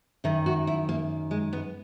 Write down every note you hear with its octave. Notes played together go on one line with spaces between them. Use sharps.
F#2 D#3 E4
F#4
E4
A#3
G#3
B3